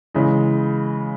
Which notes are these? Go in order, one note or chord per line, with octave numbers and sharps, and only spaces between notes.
C#3 E3 G#3